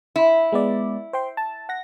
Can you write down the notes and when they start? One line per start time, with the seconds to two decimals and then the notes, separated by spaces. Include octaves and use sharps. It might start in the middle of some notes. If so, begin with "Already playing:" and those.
0.16 E4
0.52 G#3 B3 D5
1.13 C5 G5 C6
1.37 A5
1.69 F#5 A#6